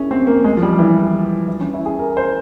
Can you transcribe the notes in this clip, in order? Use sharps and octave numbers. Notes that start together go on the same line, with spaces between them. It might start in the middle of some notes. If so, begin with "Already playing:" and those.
Already playing: C#4 E4 G#4 A#4
C4
A#3
G#3
F3
G3
E3
E3
C#4
E4
G#4
A#4
C5